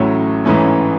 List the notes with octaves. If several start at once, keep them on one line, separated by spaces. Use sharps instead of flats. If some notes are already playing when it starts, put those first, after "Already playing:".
Already playing: A1 A2 F#3 A3 C#4
A1 G#2 E3 A3 C#4